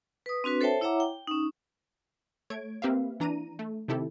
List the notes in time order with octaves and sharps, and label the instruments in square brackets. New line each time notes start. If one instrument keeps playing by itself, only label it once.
[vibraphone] B4 D#6
C4 D4 F#4 B4
A4 C5 C#5 E5 G5 A5
E4 C#5 E5 F#5 A#5 D6
G5
C#4 D#4
[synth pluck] A3 C#5 G#6 D7
A#3 C4 G4 B4 E5 F5
E3 D4 A#5 D#7
A3
C3 D#3 E4 G4 A4